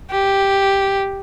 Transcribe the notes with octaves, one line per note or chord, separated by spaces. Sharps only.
G4